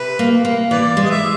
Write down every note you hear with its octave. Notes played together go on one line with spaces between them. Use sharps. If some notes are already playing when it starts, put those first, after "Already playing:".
Already playing: C3 B4
A#3
A#3
E3 B4 D5
G#3
D#5
E5